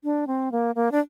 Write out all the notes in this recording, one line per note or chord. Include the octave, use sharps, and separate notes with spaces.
D4
C4
A#3
A#3
D4